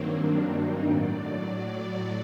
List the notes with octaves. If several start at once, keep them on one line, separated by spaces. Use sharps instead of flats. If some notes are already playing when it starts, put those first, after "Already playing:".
Already playing: G2 D#3 F#3 A#3 C4
D4
D#4
A2 F#3 D5